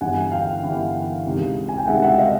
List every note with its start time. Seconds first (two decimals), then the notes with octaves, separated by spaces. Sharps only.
0.01 G1 G2 E3 F#5 G#5
0.32 F5 G5
0.64 G1 G2 E3
1.26 C#2 C3 D#3 G#3
1.69 G#5
1.78 G5
1.87 C#2 C3 D#3 G#3 E5 F#5
2.02 E5 F#5
2.17 D#5 F5